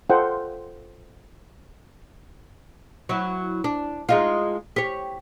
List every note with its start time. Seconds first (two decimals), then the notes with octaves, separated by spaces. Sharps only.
0.10 F4 A4 C5 D#5 F#5 G5
3.09 F#3 E4
3.64 D4
4.09 G#3 D#4 F4
4.76 G4 C#5